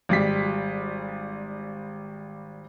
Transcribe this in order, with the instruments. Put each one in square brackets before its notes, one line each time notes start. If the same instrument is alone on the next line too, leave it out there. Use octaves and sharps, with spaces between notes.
[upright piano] G#1 G3 B6